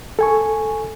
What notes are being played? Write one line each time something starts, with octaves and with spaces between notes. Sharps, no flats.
A4 G#5 C#6